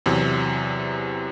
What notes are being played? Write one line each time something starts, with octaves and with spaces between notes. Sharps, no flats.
E2 C3 F#3